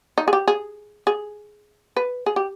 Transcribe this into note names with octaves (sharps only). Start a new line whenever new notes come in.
D#4
G#4
G4
G#4
G#4
B4
G#4
G4